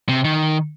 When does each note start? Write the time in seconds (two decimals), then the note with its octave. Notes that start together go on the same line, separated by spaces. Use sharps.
0.09 C3
0.24 D#3